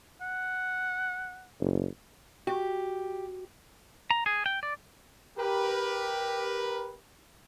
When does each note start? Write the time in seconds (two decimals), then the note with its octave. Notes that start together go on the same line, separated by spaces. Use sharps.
0.21 F#5
1.60 F#1
2.47 F#4 G4
4.11 A#5
4.26 G#4
4.46 G5
4.63 D5
5.37 G4 A#4 B4